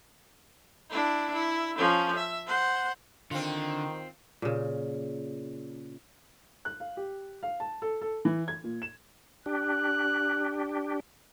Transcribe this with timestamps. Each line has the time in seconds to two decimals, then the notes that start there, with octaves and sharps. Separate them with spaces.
0.90 D4 E4
1.33 E4
1.78 F3 C#4
2.16 E5
2.47 C5 F#5
3.31 D3 D#3 C4 F4
4.42 A#2 C#3
6.65 F#6
6.80 F5
6.97 G4
7.43 F5
7.60 A5
7.82 A4
8.02 A4
8.25 E3
8.48 G#6
8.64 A#2
8.82 E7
9.46 D4 G4 F#6